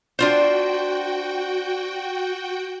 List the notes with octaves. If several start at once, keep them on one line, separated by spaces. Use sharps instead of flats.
D4 F4 F#4 C5 G5